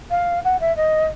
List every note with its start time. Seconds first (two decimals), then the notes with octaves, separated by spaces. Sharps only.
0.10 F5
0.44 F#5
0.60 E5
0.76 D#5